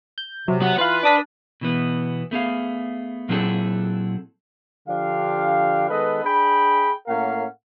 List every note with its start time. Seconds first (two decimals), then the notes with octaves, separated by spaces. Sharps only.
0.18 G6
0.48 C3 F#3
0.62 F#3 B3 F#5
0.78 E3 F4 B4 F5 F#6
1.03 D4 D6 D#6 B6
1.61 B2 E3 B3
2.31 A3 B3 G#4 F5
3.29 A#2 F#3 C4 E4 G#4 A4
4.88 D3 F3 D4 G4 F5
5.89 D#3 G#3 B3 A4 B4 D#5
6.24 D4 G#4 G5 B5
7.07 A2 A#3 C#4 A#4 F5 F#5